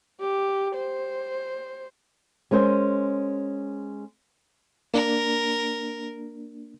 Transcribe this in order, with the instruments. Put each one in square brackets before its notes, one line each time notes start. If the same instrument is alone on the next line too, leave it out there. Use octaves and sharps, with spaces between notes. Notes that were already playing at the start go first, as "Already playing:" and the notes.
[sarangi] G4
C5
[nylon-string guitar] G#3 C#4 A#4 C5
[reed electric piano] A#3 D4 [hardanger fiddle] A#4